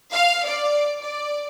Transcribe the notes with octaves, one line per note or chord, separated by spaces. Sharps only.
F5
D5
D5